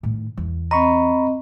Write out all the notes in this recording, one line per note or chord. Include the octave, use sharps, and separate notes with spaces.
A2 D#3
E2
C4 D#5 A#5 B5 C#6